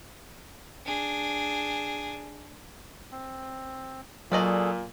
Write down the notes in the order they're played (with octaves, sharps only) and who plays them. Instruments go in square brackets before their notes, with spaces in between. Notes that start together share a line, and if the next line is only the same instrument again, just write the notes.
[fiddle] D4 G#4
[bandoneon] C4
[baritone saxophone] A#2 [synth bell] F#3 F#7 [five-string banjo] F#4 D5 D#5 [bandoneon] G#4 A4